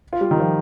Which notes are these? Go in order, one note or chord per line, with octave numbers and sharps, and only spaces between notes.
F4
G3
D#3
F3